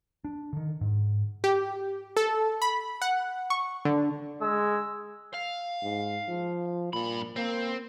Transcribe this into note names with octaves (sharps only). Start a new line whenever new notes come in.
D4
D3 D#3
G#2
G4
A4
B5
F#5
C#6
D3
G#3 E6
F5
G#2
F3
G2 A#2 B5
A#3 C4